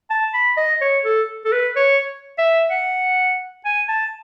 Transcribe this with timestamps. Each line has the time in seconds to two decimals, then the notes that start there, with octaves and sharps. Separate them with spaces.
0.10 A5
0.34 B5
0.57 D#5
0.81 C#5
1.05 A4
1.45 A4
1.52 B4
1.76 C#5
2.38 E5
2.70 F#5
3.65 G#5
3.88 A5